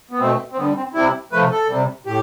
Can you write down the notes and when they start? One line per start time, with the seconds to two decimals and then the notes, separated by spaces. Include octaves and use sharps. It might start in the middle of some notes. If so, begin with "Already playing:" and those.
0.11 B3
0.19 B2 A3 C4
0.53 C4
0.57 D3 G3 B3
0.76 C4
0.94 C3 G3 E4
1.32 C3 F3 A3 B4
1.51 A4
1.69 C3 G3
2.06 A2 G4